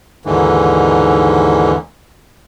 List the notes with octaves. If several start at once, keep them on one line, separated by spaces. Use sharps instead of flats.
D#2 G#2 D3 E3